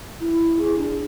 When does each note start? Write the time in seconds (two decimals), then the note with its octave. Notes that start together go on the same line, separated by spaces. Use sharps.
0.20 E4
0.58 G#4
0.78 D4